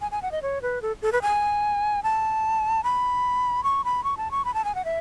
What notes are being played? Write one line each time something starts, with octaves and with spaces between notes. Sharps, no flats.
G#5
G#5
F#5
D#5
C#5
B4
A4
A4
B4
G#5
A5
B5
C#6
B5
C#6
A5
C#6
B5
A5
G#5
F#5
E5